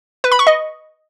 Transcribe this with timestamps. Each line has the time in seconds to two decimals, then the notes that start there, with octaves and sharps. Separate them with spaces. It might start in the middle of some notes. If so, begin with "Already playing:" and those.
0.24 B4
0.32 B5
0.39 C#6
0.47 D#5